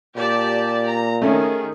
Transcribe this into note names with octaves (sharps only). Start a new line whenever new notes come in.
A#2 G4 D5 A5
A#5
D#3 A3 C#4 G#4